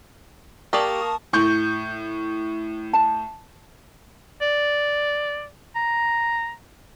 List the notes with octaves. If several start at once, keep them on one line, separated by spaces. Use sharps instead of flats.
A#3 G4 D5 A5 C#6 D#6
A2 C#6 G6
A5
D5
A#5